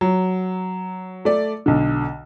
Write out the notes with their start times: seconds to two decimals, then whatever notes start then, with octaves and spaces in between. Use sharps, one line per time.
0.01 F#3
1.25 A3 D5
1.66 B1 D3